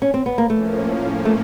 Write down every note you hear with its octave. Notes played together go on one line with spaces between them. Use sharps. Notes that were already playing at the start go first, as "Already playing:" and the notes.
C#4
C4
B3
A#3
A2 F3 A3 A#3 C#4
A3